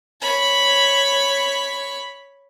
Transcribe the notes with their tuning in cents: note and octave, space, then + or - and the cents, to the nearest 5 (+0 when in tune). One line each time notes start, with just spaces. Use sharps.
C#5 +0 B5 +0